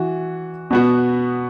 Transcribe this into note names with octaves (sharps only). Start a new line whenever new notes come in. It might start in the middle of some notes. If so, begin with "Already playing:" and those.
Already playing: E3 F#4
B2 B3 F#4